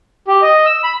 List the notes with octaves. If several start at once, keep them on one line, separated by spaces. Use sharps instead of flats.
G4
D#5
E6
B5